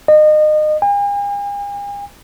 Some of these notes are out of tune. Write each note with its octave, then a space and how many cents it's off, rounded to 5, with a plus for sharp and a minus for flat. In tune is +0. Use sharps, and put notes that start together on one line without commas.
D#5 -30
G#5 -45